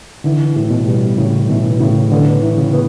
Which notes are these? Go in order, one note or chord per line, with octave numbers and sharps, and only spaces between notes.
D3 E3
A2
B2
G3
A2 C#3
B2 E3
A2 C#3
D3 B3
E3
C#3
B3